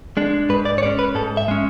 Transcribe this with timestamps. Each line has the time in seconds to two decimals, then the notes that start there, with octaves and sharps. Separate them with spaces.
0.17 G#3 D4
0.49 G#2 B4
0.65 D5
0.78 C#5
0.83 G#3 D5
0.86 C#4
0.99 B4
1.15 G#2 A4
1.37 E5
1.48 G#3 C#4